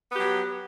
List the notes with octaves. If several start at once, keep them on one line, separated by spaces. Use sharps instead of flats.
F#3 B3 G4